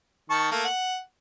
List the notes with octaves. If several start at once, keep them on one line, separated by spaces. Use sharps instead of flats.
D#3 A5 C#6
A3 A#3
F#5